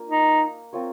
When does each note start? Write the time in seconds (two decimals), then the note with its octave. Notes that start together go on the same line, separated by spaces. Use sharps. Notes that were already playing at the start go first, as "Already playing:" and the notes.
Already playing: A#3 D4 F4
0.09 D#4
0.73 C4 F4 A#4 C#5